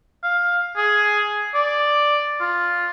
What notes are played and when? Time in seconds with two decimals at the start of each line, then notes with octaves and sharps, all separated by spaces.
0.24 F5
0.77 G#4
1.55 D5
2.40 F4